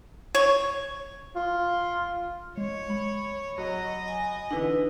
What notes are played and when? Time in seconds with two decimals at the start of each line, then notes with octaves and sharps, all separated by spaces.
0.35 C#5
1.36 F4
2.58 G#3 C#5
2.90 B5
3.58 F#3 D#5
4.08 G#5
4.51 D3 E3 D#4 E4 B4